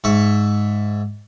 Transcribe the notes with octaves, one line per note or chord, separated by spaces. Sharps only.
G#2 E5 C#6